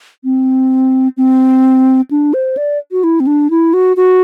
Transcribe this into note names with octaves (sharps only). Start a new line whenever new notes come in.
C4
C4
D4
C5
D5
F#4
E4
C4
D4
E4
F#4
F#4